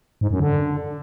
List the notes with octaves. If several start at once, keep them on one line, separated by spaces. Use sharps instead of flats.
G#2
F#2
D3